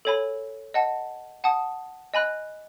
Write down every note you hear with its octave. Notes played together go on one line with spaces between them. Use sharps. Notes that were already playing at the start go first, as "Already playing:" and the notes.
A4 C#5 G#5 B5
D#5 F#5 A5
F#5 A5 D#6
D#5 G#5 B5 F#6